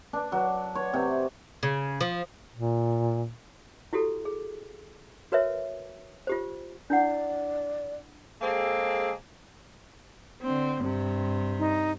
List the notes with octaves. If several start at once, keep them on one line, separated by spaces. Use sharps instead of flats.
D4
F#3
C#5
C3
C#3
F3
A#2
E4 F#4 G4 A4
G#4
F#4 A#4 B4 C#5 E5
F4 G4 C5
D4 E4 D5 F#5
G#3 A#3 C4 G#4 A4
D3 C4
G2 C3
D#4